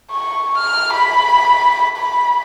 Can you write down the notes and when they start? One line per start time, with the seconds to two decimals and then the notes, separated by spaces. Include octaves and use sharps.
0.12 C#6
0.58 F6
0.93 B5
1.97 B5